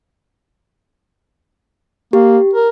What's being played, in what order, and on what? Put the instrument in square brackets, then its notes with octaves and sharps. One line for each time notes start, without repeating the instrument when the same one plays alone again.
[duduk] A#3 [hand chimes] G4
[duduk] A#4